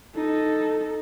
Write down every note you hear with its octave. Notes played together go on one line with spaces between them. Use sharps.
D#4 A4